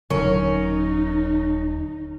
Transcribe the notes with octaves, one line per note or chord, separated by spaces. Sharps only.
D#1 D3 F#3 C#4 D#4 A#4